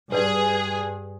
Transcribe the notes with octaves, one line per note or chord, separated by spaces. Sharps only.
G2 G#4 B4 D5